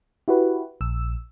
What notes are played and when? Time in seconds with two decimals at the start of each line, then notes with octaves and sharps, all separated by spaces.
0.28 E4 F#4 G4 B4
0.81 A#1 E6